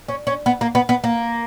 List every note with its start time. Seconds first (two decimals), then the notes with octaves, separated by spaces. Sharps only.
0.08 C#4
0.27 C#4
0.46 B3
0.61 A#3
0.75 B3
0.89 B3
1.04 A#3